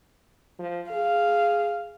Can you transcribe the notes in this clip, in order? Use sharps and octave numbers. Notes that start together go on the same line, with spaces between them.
F3
G#4 F5